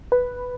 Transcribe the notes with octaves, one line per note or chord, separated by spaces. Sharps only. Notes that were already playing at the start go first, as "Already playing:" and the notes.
B4